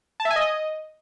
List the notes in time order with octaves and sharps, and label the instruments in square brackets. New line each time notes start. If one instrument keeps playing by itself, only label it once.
[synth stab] A5
E5
G#5
D#5